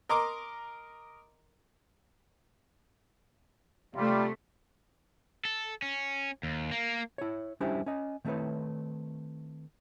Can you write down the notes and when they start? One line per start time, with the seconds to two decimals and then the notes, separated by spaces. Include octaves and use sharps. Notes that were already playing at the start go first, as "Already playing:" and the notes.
0.09 A#4 D#5 A#5 C6 D6
3.95 C3 G3 A3 F4
5.45 A4
5.82 C#4
6.43 D#2
6.71 A#3
7.18 E4 C#5
7.60 G3 C#4 D4 E4 G4 C5
7.86 C#4 D#5
8.25 D#3 A3 C4 E4 B4 C#5